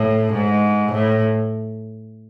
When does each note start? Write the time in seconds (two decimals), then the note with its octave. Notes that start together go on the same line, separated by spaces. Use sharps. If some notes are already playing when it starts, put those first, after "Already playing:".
Already playing: A2
0.33 G#2
0.92 A2